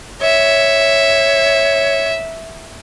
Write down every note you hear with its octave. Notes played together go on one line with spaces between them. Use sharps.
C#5 E5